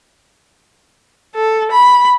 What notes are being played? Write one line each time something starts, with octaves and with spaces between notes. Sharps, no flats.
A4
B5